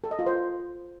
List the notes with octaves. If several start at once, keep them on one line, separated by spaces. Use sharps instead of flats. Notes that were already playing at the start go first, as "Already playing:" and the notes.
A4
D#5
F4
C5